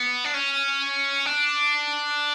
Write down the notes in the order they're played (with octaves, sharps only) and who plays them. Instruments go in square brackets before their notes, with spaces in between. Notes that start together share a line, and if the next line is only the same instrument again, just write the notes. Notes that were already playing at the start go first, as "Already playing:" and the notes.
Already playing: [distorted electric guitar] B3
D4
C#4
D4